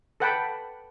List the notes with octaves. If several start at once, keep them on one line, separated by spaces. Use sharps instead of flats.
A4 B4 F#5 G5 A5 B5